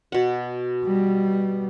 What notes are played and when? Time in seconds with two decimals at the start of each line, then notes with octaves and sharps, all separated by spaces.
0.12 B2 F#5
0.85 G3